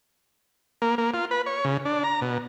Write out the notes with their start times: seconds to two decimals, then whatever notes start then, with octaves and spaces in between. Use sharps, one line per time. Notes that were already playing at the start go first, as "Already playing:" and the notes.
0.82 A#3
0.98 A#3
1.14 F4
1.31 B4
1.46 C#5
1.65 C#3
1.85 D4
2.04 A#5
2.21 B2